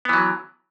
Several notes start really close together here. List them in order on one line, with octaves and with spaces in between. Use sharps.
B3 E3 F#3